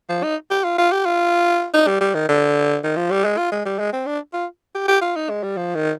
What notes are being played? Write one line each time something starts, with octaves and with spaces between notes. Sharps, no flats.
F3
D#4
G4
F4
F4
G4
F4
D#4
G3
G3
D#3
D3
D#3
F3
G3
G#3
F4
G#3
G3
G#3
C4
D4
F4
G4
G4
F4
D#4
G#3
G3
F3
D#3